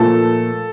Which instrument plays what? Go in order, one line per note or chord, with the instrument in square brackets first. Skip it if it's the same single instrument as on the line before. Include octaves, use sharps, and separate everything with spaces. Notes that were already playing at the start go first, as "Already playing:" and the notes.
Already playing: [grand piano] A#2 F3 A3 A4